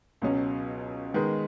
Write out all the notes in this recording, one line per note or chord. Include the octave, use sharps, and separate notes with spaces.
C#2 B2 F#3 C#4
D#3 G#3 B3